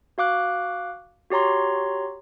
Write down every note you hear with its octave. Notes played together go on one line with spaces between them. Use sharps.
F#4 F5 D6 F#6
F#4 G4 C#5 A#5 C6